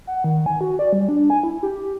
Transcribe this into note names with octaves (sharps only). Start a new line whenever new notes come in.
F#5
D#3
G#5
F#4
D5
G3
D4
G#5
E4
G4
G4